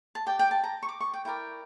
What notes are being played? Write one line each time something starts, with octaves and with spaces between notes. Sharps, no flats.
A5
G4 D5 G5
G5
A5
A#5
C#6
D6
C#6
G5
E4 A#4 D5 G5